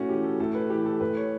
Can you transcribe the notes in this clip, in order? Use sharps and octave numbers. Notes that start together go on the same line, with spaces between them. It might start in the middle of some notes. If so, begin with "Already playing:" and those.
Already playing: A2 C#4 F#4
E3 G4
A4
A2 A4
B4
E3 G4
A4
A2 B4
C#5